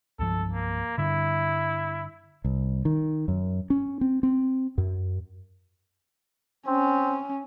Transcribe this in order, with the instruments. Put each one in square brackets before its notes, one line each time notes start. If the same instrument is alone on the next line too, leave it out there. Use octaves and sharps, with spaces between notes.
[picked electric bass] C2 G2 F3 [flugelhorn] A4
[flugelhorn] A#3
[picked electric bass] G2 D3 [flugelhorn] E4
[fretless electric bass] C2
D#3
F#2
C#4
C4
C4
F#2
[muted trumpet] C4 [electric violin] C#4